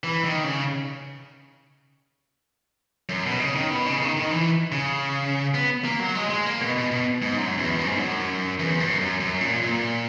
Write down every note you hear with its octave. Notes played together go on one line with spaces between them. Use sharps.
E3
D#3
C#3
F#2
B2
C#3
D#3
B2
C#3
D#3
D#3
E3
C#3
B3
A#3
F#3
G#3
G#3
A#3
B2
B2
B2
G#2
F#2
E2
F#2
G#2
F#2
E2
F#2
F#2
F#2
A#2
A#2